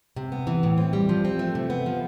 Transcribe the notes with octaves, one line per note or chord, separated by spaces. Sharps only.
C3
B3
E3
A2
C4
G3
F3
C4
A3
C3
B3
F3